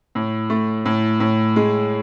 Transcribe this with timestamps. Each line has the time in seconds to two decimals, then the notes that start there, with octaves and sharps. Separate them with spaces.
0.15 A2
0.50 A3
0.86 A2
1.20 A2
1.56 G#3